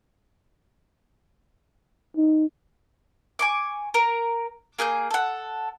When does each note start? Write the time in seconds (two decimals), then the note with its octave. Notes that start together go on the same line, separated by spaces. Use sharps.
2.17 D#4
3.39 G#5 C#6 D6
3.94 A#4 A#5
4.79 A#3 G#4 F#6 G6
5.11 A4 F#5